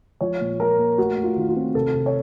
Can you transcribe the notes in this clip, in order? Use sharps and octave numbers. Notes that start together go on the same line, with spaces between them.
F3 C#5
A#2
F3 A#4
A#3
A3 F#4
A3
F4
D#3 F4
F4
C4
C3 A4
C3
C#5